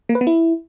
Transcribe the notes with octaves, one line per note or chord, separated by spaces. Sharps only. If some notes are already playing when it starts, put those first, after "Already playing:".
A#3
B4
B3
E4